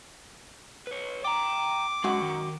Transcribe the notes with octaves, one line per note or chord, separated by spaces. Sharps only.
B4 C#5
G5 A#5 D6
F#2 G#3 F#4 F#5
D#3